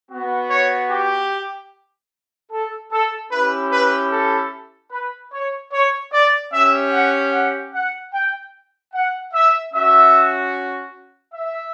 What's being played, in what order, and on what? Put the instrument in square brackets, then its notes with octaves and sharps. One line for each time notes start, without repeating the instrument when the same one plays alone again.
[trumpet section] B3 F#4
C#5
G4
A4
A4
C#4 E4 G4 B4
B4
A4
B4
C#5
C#5
D5
C#4 G4 E5
F#5
F#5
F#5
G5
F#5
E5
C#4 F#4 E5
E5